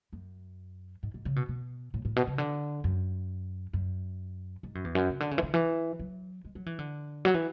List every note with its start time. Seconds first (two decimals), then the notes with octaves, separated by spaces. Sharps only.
0.13 F#2
1.03 G#2
1.14 G#2
1.25 C#3
1.36 B2
1.49 B2
1.94 A2
2.05 A2
2.16 B2
2.27 C#3
2.38 D3
2.84 F#2
3.73 F#2
4.63 G#2
4.75 F#2
4.84 E2
4.95 F#2
5.10 C#3
5.20 D3
5.31 C#3
5.38 E3
5.43 D3
5.54 E3
5.99 F#3
6.45 G#3
6.55 F#3
6.66 E3
6.79 D3
7.25 F#3
7.34 E3